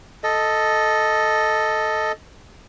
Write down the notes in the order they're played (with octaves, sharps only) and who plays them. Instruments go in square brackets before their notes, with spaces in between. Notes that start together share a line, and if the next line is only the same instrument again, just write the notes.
[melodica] A4 D#5